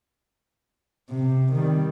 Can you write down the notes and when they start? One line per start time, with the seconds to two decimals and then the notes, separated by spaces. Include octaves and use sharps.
1.10 C3
1.53 D#3 G3